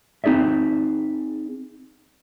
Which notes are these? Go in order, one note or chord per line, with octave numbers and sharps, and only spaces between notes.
C4 D#4 G#4 D5 E5